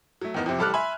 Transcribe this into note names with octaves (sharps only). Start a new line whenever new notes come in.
F#3 A3
E2 D#3 B3
F2 C3
A1 G3 A4 D6 F6 F#6
E5 G#5 B5 C6